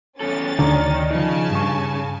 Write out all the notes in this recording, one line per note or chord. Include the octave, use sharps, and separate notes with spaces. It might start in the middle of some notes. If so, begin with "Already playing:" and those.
E2 C#4 A4 A6
D2 D3 D#3 D5 A#5
C#3 F3 D#4 G#5 A5
G2 C#6